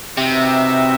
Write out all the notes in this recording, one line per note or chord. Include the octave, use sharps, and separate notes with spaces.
C3 D#4 F#4 B4 E5 G5